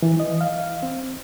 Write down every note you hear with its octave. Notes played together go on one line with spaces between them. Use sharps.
E3
D#5
F5
C4